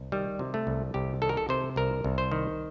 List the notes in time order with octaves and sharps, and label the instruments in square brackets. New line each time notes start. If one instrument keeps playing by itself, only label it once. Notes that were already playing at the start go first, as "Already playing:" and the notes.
Already playing: [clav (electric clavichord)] C2
D#3 G3
C3
A3
C2
C2 G4
D#3 A4
A#4
A4
C3 C5
C2 A#4
C2
C5
D#3